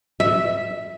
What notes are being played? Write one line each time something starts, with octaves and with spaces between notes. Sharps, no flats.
E5